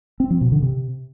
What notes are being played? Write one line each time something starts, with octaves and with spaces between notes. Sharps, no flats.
C4
F3
B2
D3
C3